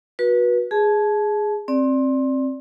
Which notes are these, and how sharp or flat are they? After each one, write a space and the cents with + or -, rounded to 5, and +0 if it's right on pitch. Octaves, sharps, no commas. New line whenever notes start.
F#4 -20 B4 -30
G#4 +0 A5 -30
C4 +20 D5 +0